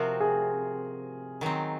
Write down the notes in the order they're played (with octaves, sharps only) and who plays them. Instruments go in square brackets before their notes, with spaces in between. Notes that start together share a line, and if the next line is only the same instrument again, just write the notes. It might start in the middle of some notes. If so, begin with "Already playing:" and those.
Already playing: [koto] C3 F3 C4 F#4 [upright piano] A#4
[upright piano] G#4
[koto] D#3 F#3 C4